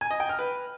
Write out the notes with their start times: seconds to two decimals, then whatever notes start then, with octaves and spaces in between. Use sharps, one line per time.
0.01 G#5
0.11 D#5
0.20 G5
0.29 F6
0.39 B4